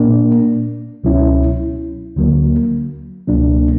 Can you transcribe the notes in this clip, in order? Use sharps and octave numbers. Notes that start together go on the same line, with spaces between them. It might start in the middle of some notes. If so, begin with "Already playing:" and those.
Already playing: A#2 A#3 D4
C#2 B2 F#3 C#4 E4
D2 D3 F#3 A#3
C#2 B2 F#3 A#3 D4